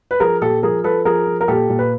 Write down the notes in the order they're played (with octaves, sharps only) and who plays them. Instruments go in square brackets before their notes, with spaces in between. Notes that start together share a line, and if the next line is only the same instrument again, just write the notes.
[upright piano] B4
F3 G#4 A#4
A#2 G4 A4
F3 G#4 A#4
F3 A4 B4
F3 G#4 A#4
F3
A#4
A#2 G4 A4
A#2
B4